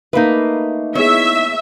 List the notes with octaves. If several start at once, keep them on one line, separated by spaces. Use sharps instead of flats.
A3 A#3 D#4 B4
B3 E4 G#4 C#5 E5